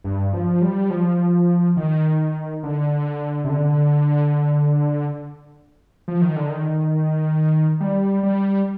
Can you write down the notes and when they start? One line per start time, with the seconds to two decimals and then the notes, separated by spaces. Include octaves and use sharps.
0.04 G2
0.33 F3
0.62 G3
0.90 F3
1.77 D#3
2.63 D3
3.44 C3
3.49 D3
6.08 F3
6.22 D#3
6.36 D3
6.49 D#3
7.81 G3
8.23 G3